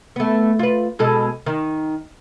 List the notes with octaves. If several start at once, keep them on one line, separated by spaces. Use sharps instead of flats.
A3 B3
F4 B4
B2 G#3 A4
D#3